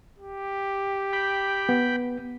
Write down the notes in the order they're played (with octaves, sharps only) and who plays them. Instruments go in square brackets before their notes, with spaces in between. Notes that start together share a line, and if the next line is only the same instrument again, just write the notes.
[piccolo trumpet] G4
[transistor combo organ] G5 B5
[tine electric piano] B3